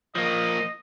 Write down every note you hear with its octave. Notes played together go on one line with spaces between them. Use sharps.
F3 A#3 D#5